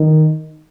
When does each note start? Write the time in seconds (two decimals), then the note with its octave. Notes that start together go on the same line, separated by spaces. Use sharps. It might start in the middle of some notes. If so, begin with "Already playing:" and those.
Already playing: D#3